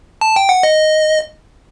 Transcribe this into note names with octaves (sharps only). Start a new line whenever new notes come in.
A5
G5
F#5
D#5